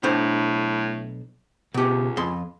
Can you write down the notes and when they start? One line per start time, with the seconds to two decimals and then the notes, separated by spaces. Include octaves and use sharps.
0.03 B1 A2 D4 C5
1.74 C#2 B2 G4
2.17 F2 C6